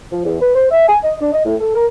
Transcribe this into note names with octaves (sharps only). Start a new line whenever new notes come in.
F3
E2
B4
C5
E5
G#5
D#5
D4
D#5
A2
A4
A#4